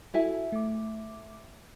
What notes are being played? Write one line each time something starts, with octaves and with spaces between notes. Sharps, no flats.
E4 F#4 A4 E5 G#5
A3 D6